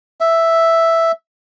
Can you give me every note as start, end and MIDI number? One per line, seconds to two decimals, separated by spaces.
0.21 1.12 76